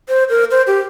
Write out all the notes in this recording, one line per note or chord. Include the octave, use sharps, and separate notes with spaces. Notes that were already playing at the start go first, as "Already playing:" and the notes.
C5
A#4
C5
G4